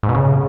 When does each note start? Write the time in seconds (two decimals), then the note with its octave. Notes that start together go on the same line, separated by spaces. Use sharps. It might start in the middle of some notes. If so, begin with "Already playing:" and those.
0.03 G#2
0.09 B2
0.14 C#3